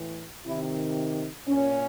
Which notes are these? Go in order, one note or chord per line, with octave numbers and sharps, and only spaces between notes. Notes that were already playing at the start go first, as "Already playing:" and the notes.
Already playing: A2 E3
C3 D#3 E4
A#2 C#4